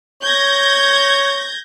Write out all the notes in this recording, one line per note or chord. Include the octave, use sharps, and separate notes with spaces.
C#5 G6 G#6 A#6